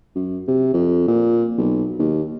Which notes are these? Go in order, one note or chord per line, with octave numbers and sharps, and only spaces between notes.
F#2
C3
F2
A#2
B1
D#2